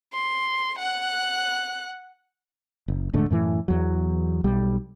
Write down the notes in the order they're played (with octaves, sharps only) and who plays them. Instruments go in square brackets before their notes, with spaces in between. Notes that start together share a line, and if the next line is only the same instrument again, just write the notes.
[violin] C6
F#5 F#6
[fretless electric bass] F#1
D#1 G#2 D3 A3
F#2 A2 E3
E2 F#3
B1 G3